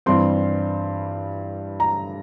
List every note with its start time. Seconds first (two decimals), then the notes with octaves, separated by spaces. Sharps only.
0.06 G2 E3 G3 C4 C6
1.80 A#5